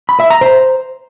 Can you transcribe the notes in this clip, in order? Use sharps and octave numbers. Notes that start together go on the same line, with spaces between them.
B5
E5
A#5
C5